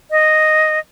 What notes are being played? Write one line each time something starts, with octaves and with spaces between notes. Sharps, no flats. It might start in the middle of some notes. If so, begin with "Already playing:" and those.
D#5